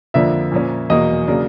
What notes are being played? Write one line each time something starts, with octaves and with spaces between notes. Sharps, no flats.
F2 D3 F3 A#3 D4 E5
A#2 F3 A#3 C#4
E2 B2 F#3 A#3 D#5
C#3 F#3 A#3 D4